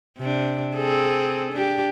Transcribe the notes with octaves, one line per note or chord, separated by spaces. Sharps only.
C3 D4
C4 G#4 A4
D4 G4